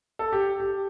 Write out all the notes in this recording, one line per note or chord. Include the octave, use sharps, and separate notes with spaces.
A4
G4
G4